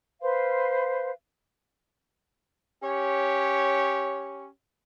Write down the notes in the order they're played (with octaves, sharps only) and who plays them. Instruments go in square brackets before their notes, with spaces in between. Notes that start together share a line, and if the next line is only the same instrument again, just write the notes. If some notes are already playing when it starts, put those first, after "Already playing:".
[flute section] B4 C5 F5 C6
[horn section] C#4 G4 C#5